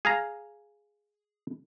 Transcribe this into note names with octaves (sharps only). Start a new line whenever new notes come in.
G#4 F5 A#5